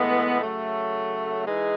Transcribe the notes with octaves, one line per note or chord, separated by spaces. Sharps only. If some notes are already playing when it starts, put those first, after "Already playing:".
Already playing: A2 E3 G#3 B3
C#3 F#3 A3
E3 G#3 D#4 G#4